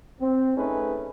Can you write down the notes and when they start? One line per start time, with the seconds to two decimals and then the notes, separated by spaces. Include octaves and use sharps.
0.21 C4
0.57 A3 C#4 D#4 G#4 B4